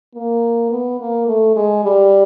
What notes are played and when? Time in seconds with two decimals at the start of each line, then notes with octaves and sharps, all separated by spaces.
0.15 A#3
0.71 B3
1.00 A#3
1.27 A3
1.56 G#3
1.84 G3